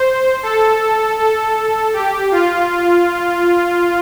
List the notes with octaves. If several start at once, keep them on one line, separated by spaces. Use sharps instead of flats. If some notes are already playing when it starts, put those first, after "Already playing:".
Already playing: C5
A4
A4
G4
F4